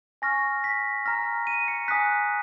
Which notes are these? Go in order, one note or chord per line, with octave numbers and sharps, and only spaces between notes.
G#5 C#6 F6 A#6
B6
A#5 F6 A#6
D#7
C#7
G#5 D#6 F#6 B6